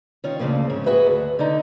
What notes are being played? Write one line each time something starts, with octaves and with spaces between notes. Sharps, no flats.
D#3 C#4 F4
D2 A2 C#3 F3 A#3
G#2 C#4
F#4 G#4 B4 E5
D2
D3 D#4